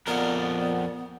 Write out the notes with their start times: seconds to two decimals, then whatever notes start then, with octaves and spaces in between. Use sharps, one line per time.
0.07 F2 A#2 B3 A#4 D5 F#5